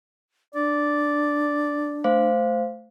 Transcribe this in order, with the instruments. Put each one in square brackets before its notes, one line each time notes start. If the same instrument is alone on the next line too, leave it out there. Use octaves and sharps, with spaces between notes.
[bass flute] D4 [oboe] D5
[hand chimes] A3 C5 F5